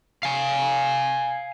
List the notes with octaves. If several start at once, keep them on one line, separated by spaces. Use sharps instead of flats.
F5 G#5